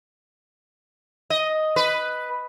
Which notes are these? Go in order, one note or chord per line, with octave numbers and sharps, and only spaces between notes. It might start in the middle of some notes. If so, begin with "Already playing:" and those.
D#5
B4